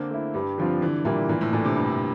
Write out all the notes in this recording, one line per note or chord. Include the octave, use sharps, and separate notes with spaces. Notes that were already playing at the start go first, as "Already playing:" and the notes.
Already playing: D3 A#3 C4 D4
A3 E4
G2 G3
D3 F3 G3 C4 F4
D3 E3
A#2 G3 A#3 E4
A#2 E3
A2
A#2 A3 D4 A4
C3
G2